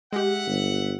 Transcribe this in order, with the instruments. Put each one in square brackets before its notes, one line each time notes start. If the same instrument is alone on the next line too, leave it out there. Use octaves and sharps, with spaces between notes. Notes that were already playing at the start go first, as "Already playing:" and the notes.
[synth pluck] G#3 G4 [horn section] E5 F#5
[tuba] G1